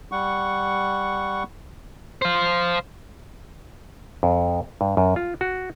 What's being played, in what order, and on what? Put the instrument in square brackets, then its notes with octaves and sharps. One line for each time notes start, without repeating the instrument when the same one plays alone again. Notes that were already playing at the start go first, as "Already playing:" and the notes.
[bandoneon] G3 F#5 C#6
[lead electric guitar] C5 F5
[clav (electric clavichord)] F2
G2
F#2
F4
F#4